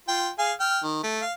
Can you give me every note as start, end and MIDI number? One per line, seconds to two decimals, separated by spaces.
0.08 0.30 65
0.08 0.30 79
0.39 0.53 68
0.39 0.53 77
0.39 0.53 80
0.60 0.81 79
0.60 0.81 89
0.84 1.02 51
1.03 1.21 57
1.22 1.33 77